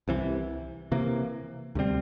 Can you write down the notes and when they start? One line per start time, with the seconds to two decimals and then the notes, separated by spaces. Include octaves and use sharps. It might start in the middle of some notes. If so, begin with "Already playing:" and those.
0.08 C2 C3 E3
0.92 C3 E3 A#3
1.75 D2 C3 G3 C4